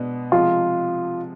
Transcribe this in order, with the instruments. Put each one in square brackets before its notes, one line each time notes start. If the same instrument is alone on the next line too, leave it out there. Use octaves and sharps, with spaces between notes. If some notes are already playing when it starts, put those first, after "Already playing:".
Already playing: [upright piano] B2 G#3 B3 D4
[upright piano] C3 F3 G#3 [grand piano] F4